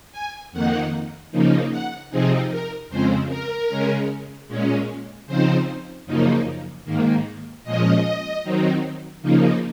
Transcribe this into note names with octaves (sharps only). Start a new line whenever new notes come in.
G#5
F2 D#3 A#3 D#4 F#5
C#3 F3 A#3 D#4
F#5
C3 F3 C4 D#4 G#4
A#4
F2 C#3 F3 G#3 C4 C5
A#4
C#3 G#3 C#4
A#2 G#3 C#4
C#3 F3 C4 D#4 C5
F#2 C#3 F3 A#3 D#4
G#2 D#3 A#3
A#2 F3 G#3 C#4 D#5
D#3 F#3 C4 D#4
C#3 F3 A#3 D#4